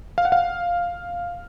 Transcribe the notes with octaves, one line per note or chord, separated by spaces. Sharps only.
F5
F#5
F5